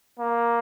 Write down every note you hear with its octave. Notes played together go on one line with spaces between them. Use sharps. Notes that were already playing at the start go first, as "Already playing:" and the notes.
A#3